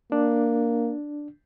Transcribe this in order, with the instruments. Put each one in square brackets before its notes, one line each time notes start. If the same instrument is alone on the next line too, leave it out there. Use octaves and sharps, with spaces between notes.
[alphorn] A#3 [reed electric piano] D4